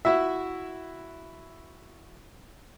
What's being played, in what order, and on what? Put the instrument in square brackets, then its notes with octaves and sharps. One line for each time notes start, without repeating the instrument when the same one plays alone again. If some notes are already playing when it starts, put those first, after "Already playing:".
[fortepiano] E4 F#4 E5